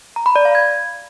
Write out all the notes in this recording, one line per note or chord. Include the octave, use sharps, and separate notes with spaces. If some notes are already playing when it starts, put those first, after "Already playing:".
A#5
B5
D5
F5
G#6